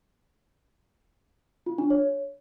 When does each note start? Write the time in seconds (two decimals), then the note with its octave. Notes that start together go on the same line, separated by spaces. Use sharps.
1.66 F4
1.78 D4
1.90 C#5